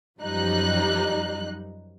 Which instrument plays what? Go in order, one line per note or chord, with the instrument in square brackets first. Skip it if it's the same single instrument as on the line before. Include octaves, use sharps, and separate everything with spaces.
[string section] F#2 F3 G3 D#4 F#6